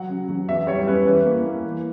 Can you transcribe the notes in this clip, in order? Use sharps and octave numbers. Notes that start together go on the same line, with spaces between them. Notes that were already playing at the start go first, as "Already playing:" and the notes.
Already playing: F#3 F#5
C#3
F#3
E2 E5
G3 C#5
C#4 B4
E3 B4
A#3
A#3
E3